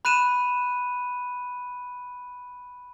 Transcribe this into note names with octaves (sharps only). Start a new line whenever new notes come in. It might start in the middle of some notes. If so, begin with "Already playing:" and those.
B5 F#6 D#7 E7